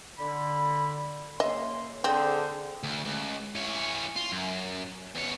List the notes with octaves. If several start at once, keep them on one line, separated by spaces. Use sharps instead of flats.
D3 B5
C#3 A#3 D#5 E5 C6
D3 C4 G#4 C5
D2
C#2
E3 C#5
F4
F#2
E2 C#5